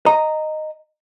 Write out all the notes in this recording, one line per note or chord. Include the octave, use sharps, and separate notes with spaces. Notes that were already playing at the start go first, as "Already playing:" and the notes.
D#5 A#5